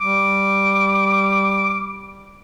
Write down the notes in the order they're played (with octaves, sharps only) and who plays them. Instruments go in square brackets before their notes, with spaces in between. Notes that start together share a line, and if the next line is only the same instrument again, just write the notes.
[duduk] G3 [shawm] D6